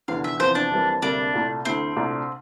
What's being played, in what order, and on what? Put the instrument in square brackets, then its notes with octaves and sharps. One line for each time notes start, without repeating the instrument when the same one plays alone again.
[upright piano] F1 E2 D3 [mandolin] F5
[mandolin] E5
[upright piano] E2 C3 F3 [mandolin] C5
[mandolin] D4
[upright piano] F2 E3 G3 A#3
[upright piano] D2 C3 G3 A#3 [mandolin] D4
[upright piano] C2 A#2 A3
[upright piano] D2 D3 A3 E4 [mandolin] C4
[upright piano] C2 A#2 A3 D4